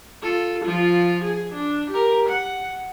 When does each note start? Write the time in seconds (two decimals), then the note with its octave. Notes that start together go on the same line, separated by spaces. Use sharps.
0.23 F4 A4
0.64 F3 F4
1.24 G#4
1.54 D4
1.90 G4 A#4
2.29 F#5